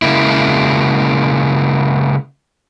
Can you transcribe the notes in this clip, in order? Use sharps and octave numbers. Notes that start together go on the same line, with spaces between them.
C#3 G#3 A#3 E4